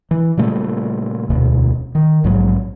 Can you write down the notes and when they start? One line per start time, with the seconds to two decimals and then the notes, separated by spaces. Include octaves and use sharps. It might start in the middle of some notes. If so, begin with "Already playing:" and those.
0.11 E3
0.37 A#2 C#3 G3 A3
1.30 E1 D2 B2
1.95 D#3
2.24 A#1 G#2 F#3